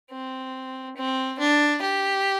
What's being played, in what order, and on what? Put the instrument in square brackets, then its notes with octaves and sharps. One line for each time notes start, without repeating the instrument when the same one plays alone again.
[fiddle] C4
C4
D4
G4